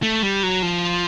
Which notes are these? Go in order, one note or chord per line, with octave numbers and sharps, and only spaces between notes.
A3
G3
F#3
F3